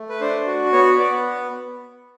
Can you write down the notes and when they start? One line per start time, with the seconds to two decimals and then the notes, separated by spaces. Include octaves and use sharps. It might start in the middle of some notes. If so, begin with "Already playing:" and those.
Already playing: A3
0.09 B4
0.21 D4 C5
0.46 F#4
0.72 B3 C#5
0.99 B3 D5